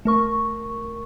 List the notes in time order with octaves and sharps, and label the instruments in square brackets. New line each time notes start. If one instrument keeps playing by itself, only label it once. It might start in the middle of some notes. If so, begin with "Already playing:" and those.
[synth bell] A3 A#4 C#6